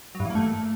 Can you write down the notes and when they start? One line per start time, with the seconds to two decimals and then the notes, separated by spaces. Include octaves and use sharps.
0.15 F#3
0.20 G2
0.25 E3
0.30 A#3
0.35 A3